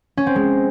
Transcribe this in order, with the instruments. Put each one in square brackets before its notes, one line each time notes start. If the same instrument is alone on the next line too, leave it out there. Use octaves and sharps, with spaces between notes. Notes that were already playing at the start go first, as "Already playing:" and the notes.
[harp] C#4
C4
G#3